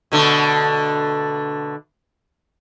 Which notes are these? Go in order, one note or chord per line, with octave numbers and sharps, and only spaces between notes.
B2 D3 A3